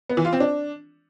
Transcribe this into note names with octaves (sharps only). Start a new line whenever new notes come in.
B3
E3
F4
C4
D4